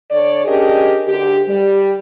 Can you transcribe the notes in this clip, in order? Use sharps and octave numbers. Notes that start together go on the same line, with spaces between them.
D3 A4 C#5 D5
C#4 D4 G4 G#4 A#4 D#5
D2 G4
G3